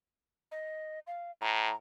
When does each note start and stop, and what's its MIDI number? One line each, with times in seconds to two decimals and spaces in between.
0.52 0.99 75
1.07 1.31 77
1.41 1.70 45
1.41 1.75 82